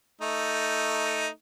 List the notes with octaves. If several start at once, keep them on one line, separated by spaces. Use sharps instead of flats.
A3 D#4